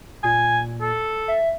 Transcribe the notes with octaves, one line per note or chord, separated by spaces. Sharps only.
A#2 G#5
A4
E5